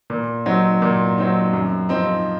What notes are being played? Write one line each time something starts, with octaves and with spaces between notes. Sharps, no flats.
A#2
F#3 C4 D#4
A#2
F#3 C4 D#4
F#2
F3 C4 D#4